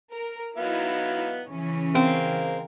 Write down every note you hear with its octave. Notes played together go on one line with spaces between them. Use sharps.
A#4
F#3 B3 D#4 E4 F5
C#3 E3 C#4
G#3 C4 A#4 F5